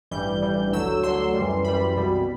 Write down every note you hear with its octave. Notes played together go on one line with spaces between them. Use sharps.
A1 G2 E3 G3 G6
A1 G2 E3 G3
D2 D3 F#3 E6
D2 D3 F#3 C6
F#2 E3 G3
F#2 E3 G3 B5
C2 B2 G3